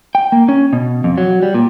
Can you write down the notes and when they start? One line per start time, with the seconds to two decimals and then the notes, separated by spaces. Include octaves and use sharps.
0.15 G5
0.32 A#3
0.49 C#4
0.73 B2
1.04 F2
1.18 F#3
1.43 G3
1.55 A#2